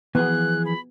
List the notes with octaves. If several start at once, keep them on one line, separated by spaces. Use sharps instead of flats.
E3 F3 B3 G#4 F#6
B5